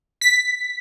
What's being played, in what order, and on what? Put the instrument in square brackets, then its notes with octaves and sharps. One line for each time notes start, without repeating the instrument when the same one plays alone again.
[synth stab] B6